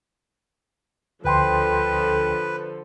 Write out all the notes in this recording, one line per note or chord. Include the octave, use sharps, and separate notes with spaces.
D2 D3 F3 A4 B4 G5 C6